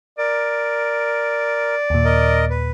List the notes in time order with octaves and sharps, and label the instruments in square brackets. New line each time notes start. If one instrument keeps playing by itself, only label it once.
[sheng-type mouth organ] A#4 [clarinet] D5
[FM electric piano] D#2 A#2
[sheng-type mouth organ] A#4 D#5
B4